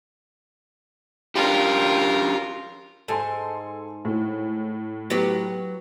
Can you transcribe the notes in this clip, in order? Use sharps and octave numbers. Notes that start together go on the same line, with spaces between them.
C#4 D4 F4 G4 A#4
G#2 A4 G#5 C6
A2
F#3 B3 G4